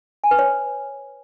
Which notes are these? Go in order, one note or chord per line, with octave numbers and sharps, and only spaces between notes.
G#5
B4
C#5